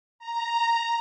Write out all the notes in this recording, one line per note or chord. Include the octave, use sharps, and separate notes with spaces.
A#5